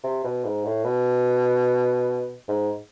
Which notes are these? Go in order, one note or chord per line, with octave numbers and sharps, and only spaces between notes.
C3
B2
G#2
A2
B2
G#2